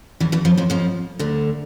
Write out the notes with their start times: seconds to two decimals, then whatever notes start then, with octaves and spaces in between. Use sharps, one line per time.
0.20 E2 E3
0.32 E2 E3
0.45 F2 F3
0.57 F2 F3
0.70 F2 F3
1.19 D2 D3